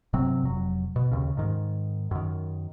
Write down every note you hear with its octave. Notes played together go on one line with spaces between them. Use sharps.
G1 C3 F#3 C4
F1 F#3
B2
D#2 C#3
G#2 D#3
F#2 D#3